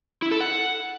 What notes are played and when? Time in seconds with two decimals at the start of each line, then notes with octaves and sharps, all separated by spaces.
0.22 E4
0.31 A4
0.40 F#5